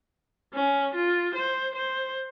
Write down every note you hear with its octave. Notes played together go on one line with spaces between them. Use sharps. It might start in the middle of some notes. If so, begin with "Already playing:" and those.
C#4
F4
C5
C5